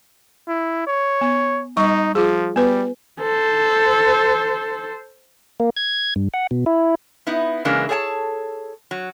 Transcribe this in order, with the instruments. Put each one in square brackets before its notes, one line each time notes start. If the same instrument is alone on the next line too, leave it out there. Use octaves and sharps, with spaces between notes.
[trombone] E4
C#5
[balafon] B3
[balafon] G3 C#6 [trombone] D#4
[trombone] F3 [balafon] F4 G#4
[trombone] G3 [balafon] B3 B4
[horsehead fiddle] A4 C5
[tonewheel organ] A#3
G#6
G2
F#5
B2
E4
[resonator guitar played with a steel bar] B3 D#4 E4
C#3 E3 G#3 A#3 D4
G#4 A4 C#5 G5 A5
F#3